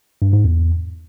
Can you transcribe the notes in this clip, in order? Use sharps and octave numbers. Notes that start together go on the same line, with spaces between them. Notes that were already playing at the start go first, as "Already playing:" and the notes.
G2
G#2
E2